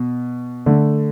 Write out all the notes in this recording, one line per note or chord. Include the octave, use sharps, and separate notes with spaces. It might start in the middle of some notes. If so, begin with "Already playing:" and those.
Already playing: B2
D3 A3